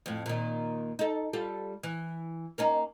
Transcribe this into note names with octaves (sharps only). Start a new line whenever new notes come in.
F2 A2
A#2 D#3
D#4 A4
G3 F4 A4
E3
A#3 C#4 D#4